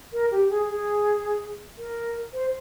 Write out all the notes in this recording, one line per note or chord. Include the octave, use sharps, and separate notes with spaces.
A#4
G4
G#4
G#4
A#4
C5